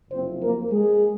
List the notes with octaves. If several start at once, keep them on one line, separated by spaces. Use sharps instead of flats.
F#1 F2 C3 F3 C4 C5
A#3 A#4
G#3 G#4